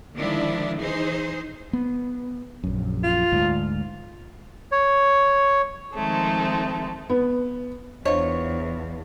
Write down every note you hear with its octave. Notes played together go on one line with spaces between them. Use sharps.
D3 D#3 F3 G#3 D4 E4
E3 D#4 G#4 C5
B3
A#1 F#2
F4
D2 G#2
C#5
D#3 F3 G#3 A3 C4
B3
E2 D4 F4 C5 C#5 D#5